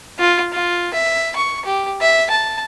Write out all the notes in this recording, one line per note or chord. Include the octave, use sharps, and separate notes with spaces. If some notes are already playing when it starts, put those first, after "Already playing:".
F4
F4
E5
C#6
G4
E5
A5